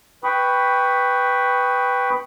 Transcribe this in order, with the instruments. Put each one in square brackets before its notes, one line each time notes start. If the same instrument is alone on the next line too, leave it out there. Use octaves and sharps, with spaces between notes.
[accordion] B4 G5 B5 C#6 D#6